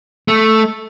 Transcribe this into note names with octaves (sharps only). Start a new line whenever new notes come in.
A3